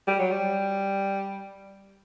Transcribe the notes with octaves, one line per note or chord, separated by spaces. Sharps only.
G3
F#3
G3